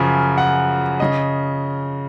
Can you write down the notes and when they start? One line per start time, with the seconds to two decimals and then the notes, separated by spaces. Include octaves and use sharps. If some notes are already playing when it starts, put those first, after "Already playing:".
Already playing: F#2 C#3 F3 G#5
0.38 F#5
1.00 C#3 D#5